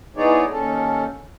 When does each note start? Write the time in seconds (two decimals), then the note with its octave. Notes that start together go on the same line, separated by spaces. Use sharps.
0.16 E3 B3 D#4 G#4 C#5 D5
0.51 D#2 C#4 A4